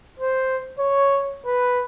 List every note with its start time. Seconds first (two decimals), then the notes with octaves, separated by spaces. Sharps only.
0.20 C5
0.79 C#5
1.46 B4